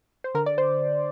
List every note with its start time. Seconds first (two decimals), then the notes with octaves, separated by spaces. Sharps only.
0.24 C5
0.34 D3 A#4
0.46 D5
0.58 C5